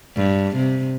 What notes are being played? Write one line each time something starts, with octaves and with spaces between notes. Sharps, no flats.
G2
C3